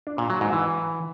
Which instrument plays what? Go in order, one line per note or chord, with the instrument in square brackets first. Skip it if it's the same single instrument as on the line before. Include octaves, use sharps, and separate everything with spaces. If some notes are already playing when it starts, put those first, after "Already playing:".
[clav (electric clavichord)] D4
A#2
F#3
G#2
E3